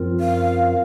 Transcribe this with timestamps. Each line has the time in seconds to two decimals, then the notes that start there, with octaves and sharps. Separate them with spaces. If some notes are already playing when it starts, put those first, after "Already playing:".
Already playing: F#2 F3 C4 F4 A#4
0.20 F5